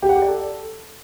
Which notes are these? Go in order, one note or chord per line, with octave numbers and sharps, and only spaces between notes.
G4
F#5
G4
D5
A4